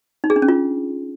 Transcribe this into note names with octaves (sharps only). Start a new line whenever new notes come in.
D#4
G#4
D4
C#4
F4